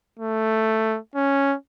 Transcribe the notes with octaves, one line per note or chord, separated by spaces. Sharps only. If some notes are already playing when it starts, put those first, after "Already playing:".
A3
C#4